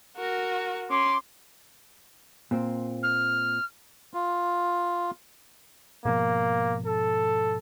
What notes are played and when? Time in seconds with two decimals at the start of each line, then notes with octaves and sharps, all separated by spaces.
0.16 F#4 A#4
0.90 C#4 C6 D6
2.51 A#2 C4
3.03 F6
4.14 F4
6.05 G#2 B2 F3 A#3
6.86 A4